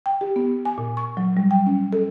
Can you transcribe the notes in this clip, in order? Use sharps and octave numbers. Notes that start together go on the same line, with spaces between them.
G5
G4
B3
G#5
A#2
C#6
F#3
G3
G5
C#4
A4